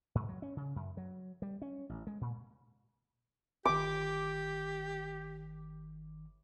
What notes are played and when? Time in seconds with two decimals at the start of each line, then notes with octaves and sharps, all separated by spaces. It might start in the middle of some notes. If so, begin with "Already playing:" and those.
0.15 G#2
0.29 F#3
0.42 C#4
0.57 C#3
0.76 F#2
0.97 F#3
1.42 G3
1.62 C#4
1.89 A1
2.07 G#3
2.21 A#2
3.65 G1 D#3 G4 D6